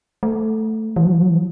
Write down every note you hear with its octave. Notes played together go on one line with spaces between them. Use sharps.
A3
E3
F#3
E3
F#3
E3